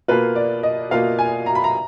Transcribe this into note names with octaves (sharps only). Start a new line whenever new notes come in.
B2 A#3 F4 B4
D5
D#5
B2 A#3 F4 F5
G#5
A#5
B5
A#5